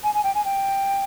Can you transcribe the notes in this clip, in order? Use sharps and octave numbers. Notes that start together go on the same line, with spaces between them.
G#5
G#5
G5
G#5
G5